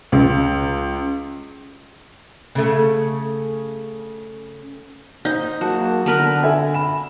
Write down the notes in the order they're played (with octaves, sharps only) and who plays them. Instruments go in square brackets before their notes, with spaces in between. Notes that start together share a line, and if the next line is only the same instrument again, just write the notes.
[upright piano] C#2
[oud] C#3 A3
[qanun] D#4 [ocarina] C5 [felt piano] G6
[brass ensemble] F#3 G#3 A#3 [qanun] F#4 [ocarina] A5
[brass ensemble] D3 [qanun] B3 A#4 B4
[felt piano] A4 E5 G#5
[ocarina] B5 [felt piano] E7